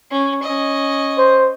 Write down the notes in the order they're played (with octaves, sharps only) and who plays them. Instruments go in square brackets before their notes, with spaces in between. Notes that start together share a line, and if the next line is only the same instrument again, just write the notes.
[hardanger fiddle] C#4
C#4 D#5
[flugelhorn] C5